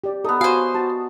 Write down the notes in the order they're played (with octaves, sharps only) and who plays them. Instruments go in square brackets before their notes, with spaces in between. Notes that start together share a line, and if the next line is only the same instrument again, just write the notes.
[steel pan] G4 D5
[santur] B3 D#4 [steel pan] A4
[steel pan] F#4 G#5 [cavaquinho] C5 F5
[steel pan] F#4 A5